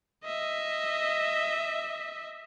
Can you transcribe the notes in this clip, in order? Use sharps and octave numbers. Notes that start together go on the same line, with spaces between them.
D#5 E5